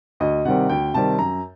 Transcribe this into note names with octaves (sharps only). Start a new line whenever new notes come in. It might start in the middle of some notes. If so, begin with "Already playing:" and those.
D2 D#5
C3 D#3 G3 C4 F#5
D2 G5
C3 D#3 G3 C4 A5
F#2 A#5